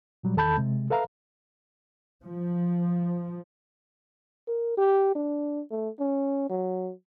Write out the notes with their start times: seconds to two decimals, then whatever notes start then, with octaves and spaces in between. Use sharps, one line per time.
0.23 A#2 F#3 G3
0.36 E2 D#3 A4 A5 B5 G6
0.57 C3 G#3
0.90 A4 B4 E5 F5 A#5
2.24 F3
4.47 A#4
4.77 G4
5.15 D4
5.71 A3
6.00 C#4
6.50 F#3